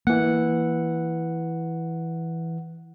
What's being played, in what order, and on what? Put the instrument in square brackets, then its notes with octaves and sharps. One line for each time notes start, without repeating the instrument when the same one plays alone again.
[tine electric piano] E3 F#5 [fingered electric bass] A#3